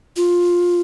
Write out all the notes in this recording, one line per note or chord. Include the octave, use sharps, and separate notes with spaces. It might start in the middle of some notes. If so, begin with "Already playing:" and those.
F4